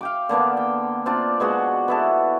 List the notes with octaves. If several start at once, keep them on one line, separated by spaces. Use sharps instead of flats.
F5 G5 D6
D3 A#3 B3 D4
G5
C4 D4 F4 D5
B2 G#3 F#4 C6
B3 E4 A4